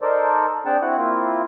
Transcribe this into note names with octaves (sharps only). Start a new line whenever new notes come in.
D#4 A4 A#4 C5 D5
C4 D4 G#4 F#5 G5 A5
C4 E4 F#4 F#5
A#3 C4 E4 F4